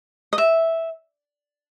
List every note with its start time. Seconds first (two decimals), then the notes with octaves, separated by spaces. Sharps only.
0.33 D#5
0.38 E5